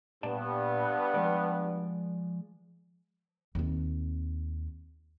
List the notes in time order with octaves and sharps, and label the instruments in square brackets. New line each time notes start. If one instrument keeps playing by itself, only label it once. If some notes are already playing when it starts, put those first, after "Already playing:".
[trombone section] G2 B3 [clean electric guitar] A#2 D5 A5
[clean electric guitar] F3 G#3 D5
[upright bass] D#2 C4